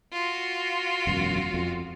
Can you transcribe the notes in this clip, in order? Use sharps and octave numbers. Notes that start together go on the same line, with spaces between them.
F4 F#4
E1 F#2
F2